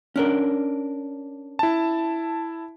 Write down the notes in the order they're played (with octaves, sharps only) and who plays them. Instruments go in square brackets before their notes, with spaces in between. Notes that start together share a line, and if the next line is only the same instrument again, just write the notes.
[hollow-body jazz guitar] C#4 D4 A#4
[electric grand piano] E4 A5